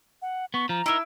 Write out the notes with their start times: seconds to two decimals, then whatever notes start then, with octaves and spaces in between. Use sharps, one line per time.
0.22 F#5
0.54 B3 C#6
0.69 F3 A#5
0.86 D#4 E4 A#4 E6